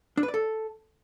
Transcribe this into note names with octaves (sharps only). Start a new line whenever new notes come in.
D4
B4
D5
A4